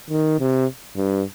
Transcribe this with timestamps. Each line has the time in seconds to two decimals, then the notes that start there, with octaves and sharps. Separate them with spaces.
0.10 D#3
0.40 C3
0.97 G2